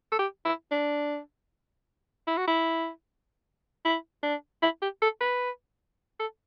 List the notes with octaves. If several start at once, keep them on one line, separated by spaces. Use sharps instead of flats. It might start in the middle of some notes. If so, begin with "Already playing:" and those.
A4
G4
E4
D4
E4
F#4
E4
E4
D4
E4
G4
A4
B4
A4